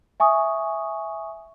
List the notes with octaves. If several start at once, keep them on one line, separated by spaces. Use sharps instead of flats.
E5 G#5 C#6 D#6